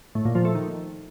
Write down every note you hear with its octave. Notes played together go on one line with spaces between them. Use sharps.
A2
A#2
F3
A3
D#3